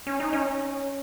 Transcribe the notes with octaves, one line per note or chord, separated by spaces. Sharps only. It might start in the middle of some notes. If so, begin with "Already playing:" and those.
C#4
D#4
C#4